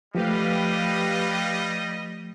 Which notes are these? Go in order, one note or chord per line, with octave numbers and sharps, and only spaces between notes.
F3 G3 A3 G4 B4 D#5 F5